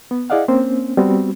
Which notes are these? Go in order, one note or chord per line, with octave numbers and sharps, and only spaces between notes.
B3
E4 G#4 D5 D#5 F5 F#5
A#3 C4 C#4 C5
G3 B3 C4 F#4